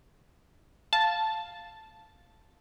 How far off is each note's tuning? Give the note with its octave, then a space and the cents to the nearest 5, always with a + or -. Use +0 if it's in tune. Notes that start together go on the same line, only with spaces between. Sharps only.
F5 +0 A5 +0